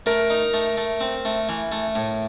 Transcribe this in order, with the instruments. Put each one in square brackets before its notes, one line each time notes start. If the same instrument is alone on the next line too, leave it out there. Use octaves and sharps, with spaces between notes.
[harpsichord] A3 [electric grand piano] A#4
[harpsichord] D#4
A3
A3
C4
A3
E3
A3
A2